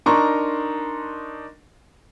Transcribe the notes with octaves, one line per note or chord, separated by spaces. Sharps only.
D4 D#4 A#4 A#5 C6 C#6